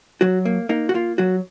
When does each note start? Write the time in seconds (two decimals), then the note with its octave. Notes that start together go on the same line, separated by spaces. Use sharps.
0.21 F#3 F#4
0.45 A#3
0.69 A#3 D#4
0.89 F#4
0.94 A#3 F4
1.18 F#3 F#4